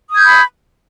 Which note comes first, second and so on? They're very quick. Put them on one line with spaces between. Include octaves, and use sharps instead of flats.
D#6 G#6 G6 B5